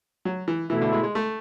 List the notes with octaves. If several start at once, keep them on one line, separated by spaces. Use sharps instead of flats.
F#3
E3
B2 E3 A3 E4
D3
G#3
G#3
A3